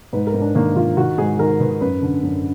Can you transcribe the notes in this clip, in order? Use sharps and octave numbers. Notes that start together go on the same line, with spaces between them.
G#2 B4
A#4
G#2
D4
D#3 A#3
D#3 F4
D#3 F#4
G#2 G#4
D#3 A#4
D#3 B4
F#2 B4
D3
F#2